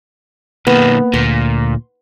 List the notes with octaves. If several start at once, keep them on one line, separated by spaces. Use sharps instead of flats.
B1 D#3 A#3 B3
D2 A#2 C6